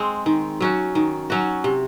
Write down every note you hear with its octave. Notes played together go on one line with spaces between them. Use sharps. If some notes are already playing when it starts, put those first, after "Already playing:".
Already playing: G#3 C4
D#3
F#3 C#4 F#4
D#3
F#3 C#4 F#4
C3